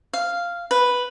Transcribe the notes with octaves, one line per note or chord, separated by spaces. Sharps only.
F5
B4